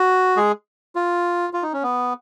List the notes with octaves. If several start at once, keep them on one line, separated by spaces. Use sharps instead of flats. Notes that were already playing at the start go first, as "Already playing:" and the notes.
Already playing: F#4
G#3 G#4
F4
F4
D#4
C#4
B3